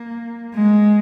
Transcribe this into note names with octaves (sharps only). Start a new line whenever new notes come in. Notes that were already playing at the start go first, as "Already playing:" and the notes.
Already playing: A#3
G#3